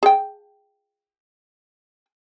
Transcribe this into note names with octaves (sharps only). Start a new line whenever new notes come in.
G#4 G5